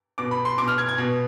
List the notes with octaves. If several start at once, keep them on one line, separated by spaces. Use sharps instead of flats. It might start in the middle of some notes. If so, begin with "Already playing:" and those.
B2 D6
B5
C6
B2 D6
F6
G#6
G#6
B2